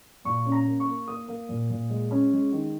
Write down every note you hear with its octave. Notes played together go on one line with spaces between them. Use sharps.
A#2 C#6
C#4
A#5
A#3
C#6
A#3
A#3 D#6
A#3
A#2
A#2
G#3
C#4
G#3
D#3